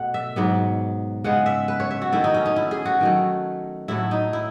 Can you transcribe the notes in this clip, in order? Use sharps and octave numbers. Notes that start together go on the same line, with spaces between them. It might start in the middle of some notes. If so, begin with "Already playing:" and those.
Already playing: B2 A3 F#5
E5
G#2 F#3 B3
C#3 G#3 B3 F#5
E5
B4
C#5
E5
F#4
D#3 A3 E4
D#4
C#4
D#4
E4
G#4
F#4
D#3 F#3 A3
A2 F#3 A3 E4
D#4
E4